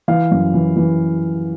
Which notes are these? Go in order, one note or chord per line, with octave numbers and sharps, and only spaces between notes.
E3 F5
F#2
E3
E3